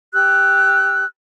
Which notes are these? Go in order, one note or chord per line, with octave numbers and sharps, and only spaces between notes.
G4 E6 F#6